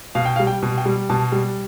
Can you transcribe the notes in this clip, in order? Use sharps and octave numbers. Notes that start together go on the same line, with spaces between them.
B2 F5
G5
F5
G3
G5
B2
G5
G3
B2 A5
G3